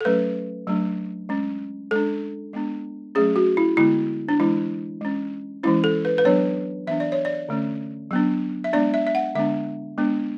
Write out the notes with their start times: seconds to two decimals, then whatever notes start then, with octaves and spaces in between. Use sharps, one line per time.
0.01 A4
0.05 F#3 A3 C#4 B4
0.67 F#3 A3 D4
1.29 G#3 C#4
1.91 G#3 D4 A4
2.53 G#3 B3 D4
3.15 F#3 A3 C#4 G#4
3.36 F#4
3.57 E4
3.77 D3 G#3 B3 E4
4.29 D4
4.39 E3 G#3 D4 E4
5.01 G#3 C#4
5.63 E3 G#3 C#4 E4
5.84 A4
6.05 B4
6.18 B4
6.25 F#3 B3 D4 C#5
6.87 E3 B3 D4 E5
7.00 D5
7.12 C#5
7.25 D5
7.49 D3 A3 C#4
8.11 F#3 B3 D4
8.64 E5
8.73 G#3 B3 D4 D5
8.94 E5
9.07 E5
9.15 F#5
9.35 D3 G#3 B3 D4 E5
9.98 G#3 B3 D4